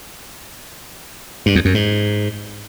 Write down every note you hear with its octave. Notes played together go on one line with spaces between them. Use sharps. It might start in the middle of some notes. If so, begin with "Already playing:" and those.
G2
E2
F#2
G#2